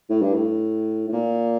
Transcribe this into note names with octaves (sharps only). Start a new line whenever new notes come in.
A2
G2
A2
A2
A#2